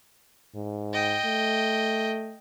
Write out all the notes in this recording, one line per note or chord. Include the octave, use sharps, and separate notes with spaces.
G#2
D#5 G5
A3